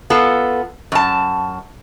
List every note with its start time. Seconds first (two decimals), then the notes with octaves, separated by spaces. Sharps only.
0.10 B3 F4 A4
0.92 F#2 A5